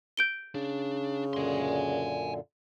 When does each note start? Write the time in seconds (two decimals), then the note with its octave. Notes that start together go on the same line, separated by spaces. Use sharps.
0.17 G6 D7 G7
0.55 C#3 D4
1.33 F#2 A#2 D3 G#5 C6